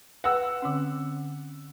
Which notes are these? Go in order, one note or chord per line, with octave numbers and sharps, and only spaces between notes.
B4 F#5 G5 E6
D3 C4 C#4